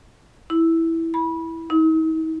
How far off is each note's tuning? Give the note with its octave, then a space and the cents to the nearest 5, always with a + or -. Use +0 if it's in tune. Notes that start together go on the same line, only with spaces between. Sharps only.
E4 -5
B5 -20
D#4 +45